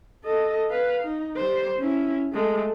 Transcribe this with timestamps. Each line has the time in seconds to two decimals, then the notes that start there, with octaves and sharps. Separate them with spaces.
0.24 A4 D#5
0.70 B4 F5
1.04 D#4
1.37 G3 C5
1.79 C#4 E4
2.32 G#3 A3